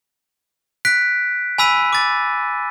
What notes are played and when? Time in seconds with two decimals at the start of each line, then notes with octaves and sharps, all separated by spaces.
0.85 F#6 B6 D7
1.58 G#5 B5 E6 B6 D#7
1.93 D6 A6